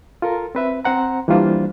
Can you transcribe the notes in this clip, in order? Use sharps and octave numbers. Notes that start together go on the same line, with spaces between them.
F4 A4 A#4
C4 B4 E5
C4 C5 F#5 A#5
E3 G3 A#3 D4 F4 C5